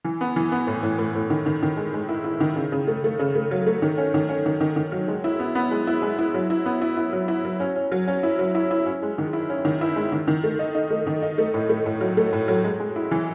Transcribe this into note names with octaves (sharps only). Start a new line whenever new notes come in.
E3
B3
E3
B3
A2
A2
A2
A2
D#3
D#3
D#3
G#3
G#3
E4
E4
D#3
C#3
C#3
A3
A3
C#3
A3
F#3
A3
D#3
C#4
D#3
C#4
D#3
D#3
D#3
F#3
G#3
E4
B3
B3
G#3
E4
G#3
E4
F#3
E4
B3
E4
E4
F#3
E4
F#3
C#4
C#4
F#3
C#4
E4
F#3
E4
E4
C#4
G#3
D#3
E4
C#4
D#3
E4
G#3
D#3
D#3
A3
D#4
D#4
A3
D#3
D#4
A3
A2
A3
A2
F#3
A3
A2
F#3
G#3
G#3
E4
E3